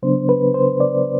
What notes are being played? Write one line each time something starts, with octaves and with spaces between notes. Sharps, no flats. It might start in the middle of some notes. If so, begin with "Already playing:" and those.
C#3 F#3 B3 D4 C5
B4
C5
D5